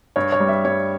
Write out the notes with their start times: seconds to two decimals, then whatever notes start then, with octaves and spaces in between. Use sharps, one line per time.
0.16 G2 C#5
0.32 C#5
0.40 G3
0.49 E5
0.65 G2 C#5